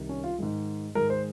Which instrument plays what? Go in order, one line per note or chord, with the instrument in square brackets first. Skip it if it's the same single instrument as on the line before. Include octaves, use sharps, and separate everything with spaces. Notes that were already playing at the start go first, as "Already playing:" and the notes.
Already playing: [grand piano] C2 C3 D#3
C#4
F4
G#2 D#3 G#3
G#2 D#3 G#3 A#4
C5